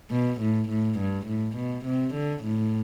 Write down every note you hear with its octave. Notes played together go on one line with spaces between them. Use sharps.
B2
A2
A2
G2
A2
B2
C3
D3
A2